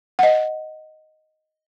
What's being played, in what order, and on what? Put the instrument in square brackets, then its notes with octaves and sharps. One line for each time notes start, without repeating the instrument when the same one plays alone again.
[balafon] D#5 F#5